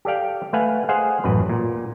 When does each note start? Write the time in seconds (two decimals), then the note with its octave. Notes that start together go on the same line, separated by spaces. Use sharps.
0.05 G4 A4 D5 F5 G5
0.53 A3 B4 F5 F#5 G#5
0.89 G#4 C5 D#5 F5 F#5 G#5
1.24 A1 F#2 B4
1.49 A#2